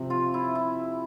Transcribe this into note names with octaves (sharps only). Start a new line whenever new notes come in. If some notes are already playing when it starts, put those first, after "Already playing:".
Already playing: C3 F3 C4
F4
E4
E4